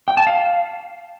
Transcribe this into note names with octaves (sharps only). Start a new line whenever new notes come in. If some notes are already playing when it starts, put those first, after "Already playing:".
G5
A5
F5